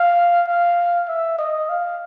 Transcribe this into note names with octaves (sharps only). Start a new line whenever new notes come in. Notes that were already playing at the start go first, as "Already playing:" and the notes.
Already playing: F5
F5
E5
D#5
F5